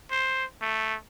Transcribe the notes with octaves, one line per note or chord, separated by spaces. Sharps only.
C5
A3